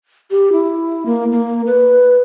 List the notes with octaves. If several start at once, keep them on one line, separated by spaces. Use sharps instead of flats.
G4
E4
A#3
A#3
B4